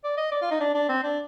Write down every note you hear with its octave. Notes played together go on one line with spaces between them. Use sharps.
D5
D#5
D5
F4
D#4
D4
D4
C4
D4